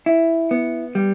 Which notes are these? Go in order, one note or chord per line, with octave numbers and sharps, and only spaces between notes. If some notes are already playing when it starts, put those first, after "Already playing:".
E4
B3
G3